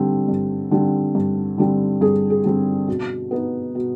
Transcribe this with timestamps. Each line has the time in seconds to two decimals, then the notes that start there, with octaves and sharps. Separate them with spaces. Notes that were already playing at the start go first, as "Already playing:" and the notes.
Already playing: G2 D3 G3 C4
0.28 G2
0.71 D3 G3 C4
1.15 G2
1.58 D3 G3 C4
2.01 G2 G#4
2.30 G#4
2.44 D3 G3 C4
2.88 B2
3.31 B3 D#4
3.75 B2